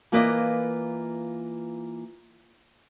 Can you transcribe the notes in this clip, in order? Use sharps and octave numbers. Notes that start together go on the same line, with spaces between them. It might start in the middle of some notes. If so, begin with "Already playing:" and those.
E3 A#3 F4 B4 D5 D#5